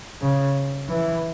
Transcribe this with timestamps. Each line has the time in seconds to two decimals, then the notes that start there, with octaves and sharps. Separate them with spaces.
0.22 C#3
0.89 E3